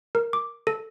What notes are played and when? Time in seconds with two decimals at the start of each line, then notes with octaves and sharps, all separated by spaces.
0.15 A#4
0.33 D6
0.67 A4